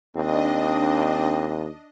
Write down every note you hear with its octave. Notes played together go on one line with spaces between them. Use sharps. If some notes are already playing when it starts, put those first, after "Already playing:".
D#2 C4 D4 D#5